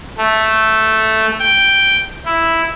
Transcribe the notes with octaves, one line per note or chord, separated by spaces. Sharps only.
A3
G5
E4